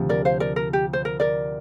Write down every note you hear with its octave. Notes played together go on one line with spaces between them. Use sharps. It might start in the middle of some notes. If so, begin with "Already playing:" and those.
Already playing: D2 C3 F3
A#4 D5
C5 F5
A#4 D5
A#4
G4
C5
A#4
A#4 D5